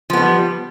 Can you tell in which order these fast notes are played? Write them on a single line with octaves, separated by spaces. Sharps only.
F3 B3 G3